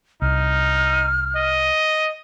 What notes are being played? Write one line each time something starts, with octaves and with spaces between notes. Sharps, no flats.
C2 D#4 F6
D#5